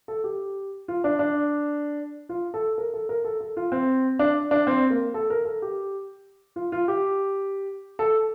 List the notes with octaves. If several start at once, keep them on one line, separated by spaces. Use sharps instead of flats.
A4
G4
F4
D4
D4
F4
A4
A#4
A4
A#4
A4
A4
F4
C4
D4
D4
C4
A#3
A4
A#4
A4
G4
F4
F4
G4
A4